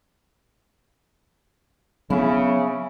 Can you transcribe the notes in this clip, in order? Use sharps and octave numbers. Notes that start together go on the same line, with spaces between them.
C#3 F#3 B3 C4 E4